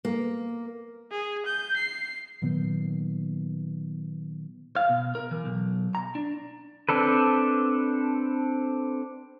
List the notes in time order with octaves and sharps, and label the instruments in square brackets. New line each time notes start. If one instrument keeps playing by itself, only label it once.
[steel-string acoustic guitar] A#3
[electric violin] G#4
G6
C7
[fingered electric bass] A#2 D#3 F#3 B3
[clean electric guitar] F5
B2
A#4
E3
B1
A#5
D4
[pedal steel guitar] C4 D4 A4 B4